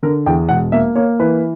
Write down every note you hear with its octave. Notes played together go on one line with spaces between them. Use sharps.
D3 A#4
E2 G5
E1 F#5
A#3 E5
A#3 C#5
E3 B4